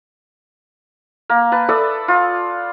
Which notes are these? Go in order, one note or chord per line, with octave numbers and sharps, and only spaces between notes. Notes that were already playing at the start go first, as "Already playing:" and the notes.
A#3
B4 A5
A4 D5 E5 D#6
F4